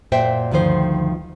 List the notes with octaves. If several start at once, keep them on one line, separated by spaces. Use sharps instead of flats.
F#2 A#2 C5 E5 G5
D2 G2 D#3 F3 C5